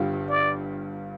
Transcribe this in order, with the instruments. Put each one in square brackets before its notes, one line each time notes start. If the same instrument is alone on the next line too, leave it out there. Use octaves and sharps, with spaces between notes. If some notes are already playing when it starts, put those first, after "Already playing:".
Already playing: [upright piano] G1 G2 G3 F4
[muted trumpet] D5